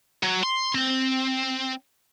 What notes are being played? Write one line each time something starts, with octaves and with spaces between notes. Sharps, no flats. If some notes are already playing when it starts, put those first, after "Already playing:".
F#3
C6
C4